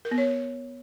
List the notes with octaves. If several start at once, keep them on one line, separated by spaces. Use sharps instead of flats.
A#4
B3
C#5